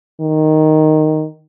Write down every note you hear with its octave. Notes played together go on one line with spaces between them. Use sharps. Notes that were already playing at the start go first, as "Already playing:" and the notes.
D#3